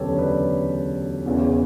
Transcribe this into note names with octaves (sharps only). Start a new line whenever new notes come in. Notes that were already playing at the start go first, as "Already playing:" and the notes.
Already playing: E1 D2 C#3 F#3 G4 A4 B4 C#5
C#5
B4 D5
E1 E2 C#3 E3